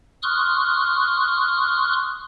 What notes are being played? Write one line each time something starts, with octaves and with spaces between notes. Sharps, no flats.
C6 C#6 D#6 F6 F#6